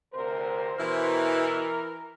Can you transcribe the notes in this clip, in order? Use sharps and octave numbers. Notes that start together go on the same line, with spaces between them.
D2 C3 A#4 C5
B2 E3 E4 A#4